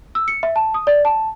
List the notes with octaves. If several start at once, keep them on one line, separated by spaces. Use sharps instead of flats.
E6
C#7
E5
A5
D#6
D5
A5